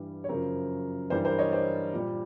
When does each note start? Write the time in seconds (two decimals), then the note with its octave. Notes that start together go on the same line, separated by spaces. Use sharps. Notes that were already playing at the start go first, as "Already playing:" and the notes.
Already playing: G2 E3 G3
0.24 C#5
0.29 F#2 C#3 F3 A#4 C5
1.10 G2 E3 G3 A#4 C5
1.25 A#4 C5
1.38 C#5 D#5
1.52 C5 D5
1.93 A#2 G3